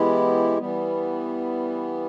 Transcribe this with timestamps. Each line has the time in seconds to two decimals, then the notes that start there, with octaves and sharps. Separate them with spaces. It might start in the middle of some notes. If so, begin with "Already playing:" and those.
Already playing: E3 G#3 B3 E4 G4
0.58 E3 G3 B3